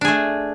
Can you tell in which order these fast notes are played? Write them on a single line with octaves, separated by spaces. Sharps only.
D4 G#4 A3